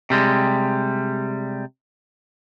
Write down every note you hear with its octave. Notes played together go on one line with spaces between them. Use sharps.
C3 G3 G#3